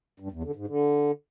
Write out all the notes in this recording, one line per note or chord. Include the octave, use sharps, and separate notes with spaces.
G2
E2
D3
G#2
D3